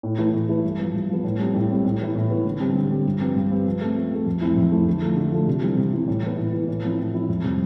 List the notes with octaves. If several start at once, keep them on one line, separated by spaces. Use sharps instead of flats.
A2
E3 A3 E4 B4
A2
E3 A3 E4 B4
G2
F3 B3
G2
F3 B3
A2
G3 C4 G4
A2
G3 C4 G4
A2
E3 B3 E4
A2
E3 B3 E4
D3
G3 C4 G4
D3
G3 C4 G4
G2
F3 C4 G4 B4
G2
F3 C4 G4 B4
F3
A3 C4
F3
A3 C4
F2
E3 A3 C4 E4
F2
E3 A3 C4 E4
D3
F3 A3
D3
F3 A3
C3
E3 G3 C4
C3
E3 G3 C4
A2
E3 B3
A2
E3 B3
A2
F3 C4 E4
A2
F3 C4 E4
F2
C3 G3 C4